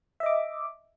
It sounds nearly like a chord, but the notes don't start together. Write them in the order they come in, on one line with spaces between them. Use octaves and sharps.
E5 D#5 D6